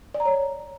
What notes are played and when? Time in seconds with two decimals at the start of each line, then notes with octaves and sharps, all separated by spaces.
0.14 D5
0.20 A#5
0.25 C#5